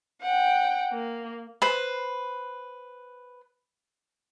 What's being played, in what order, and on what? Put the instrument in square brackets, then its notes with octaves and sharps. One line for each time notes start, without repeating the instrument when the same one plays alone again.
[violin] F#5 G5
A#3
[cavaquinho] B4 C5